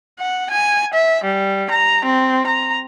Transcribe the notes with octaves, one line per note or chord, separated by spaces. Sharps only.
F#5
G#5
E5
G3
A#5
C4
A#5